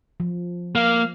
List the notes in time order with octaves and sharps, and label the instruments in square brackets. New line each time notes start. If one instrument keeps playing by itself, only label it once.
[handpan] F3
[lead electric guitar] A#3 [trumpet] F5